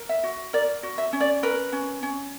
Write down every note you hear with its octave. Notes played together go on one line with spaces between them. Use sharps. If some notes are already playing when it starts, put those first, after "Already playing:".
Already playing: A#4
E5
F#4
A#4 D5
F#4
E5
C#4
D5
A#4 B4
C#4
C#4